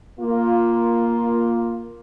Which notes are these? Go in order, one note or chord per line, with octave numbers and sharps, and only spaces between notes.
A#3 F4